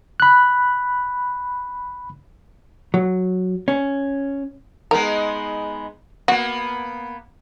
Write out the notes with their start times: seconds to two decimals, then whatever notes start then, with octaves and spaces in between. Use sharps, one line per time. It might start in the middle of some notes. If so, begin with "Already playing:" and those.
0.20 B5 F#6
2.94 F#3
3.68 C#4
4.91 G#3 B3 D#4 A#4
6.28 A#3 B3 F#4